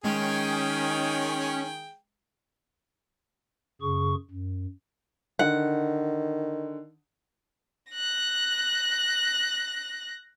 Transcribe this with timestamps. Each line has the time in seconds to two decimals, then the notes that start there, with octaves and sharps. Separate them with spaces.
0.04 D#3 G#3 C#4 G#4 G5
3.81 F#2 C#3 G#4 C#6
4.30 F#2
5.39 D3 D#3 F#5
7.92 F#6 A#6